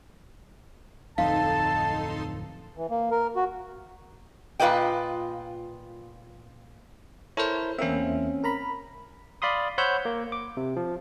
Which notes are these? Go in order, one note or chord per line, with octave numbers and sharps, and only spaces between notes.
D1 F2 D#4 A4 F5 A5 C6
E3
A#3
A#4
F#4
A#2 F4 B4 D5 D#5 G5
E4 A4 A#4 C5 C#5
E2 A#3 C4 C#4 E5
A#4 A#5 B5
D5 F5 B5 C6 D#6
C5 C#5 F#5 B5 E6 G6
A#3
D6
C3
F3